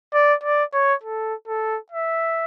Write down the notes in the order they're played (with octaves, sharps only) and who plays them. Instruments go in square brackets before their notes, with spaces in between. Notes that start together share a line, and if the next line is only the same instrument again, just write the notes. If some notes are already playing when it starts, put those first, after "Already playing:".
[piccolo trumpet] D5
D5
C#5
A4
A4
E5